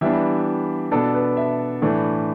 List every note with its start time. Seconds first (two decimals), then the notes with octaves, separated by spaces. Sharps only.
0.01 E3 G3 B3 D4 E5
0.92 B2 B3 D4 A4
1.14 B4
1.37 E5
1.82 A2 E3 A3 D4